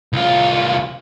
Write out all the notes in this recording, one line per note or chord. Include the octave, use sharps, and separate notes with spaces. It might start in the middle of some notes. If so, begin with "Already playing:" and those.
C2 F4